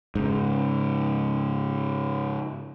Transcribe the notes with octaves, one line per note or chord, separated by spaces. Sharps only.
G#2 C#3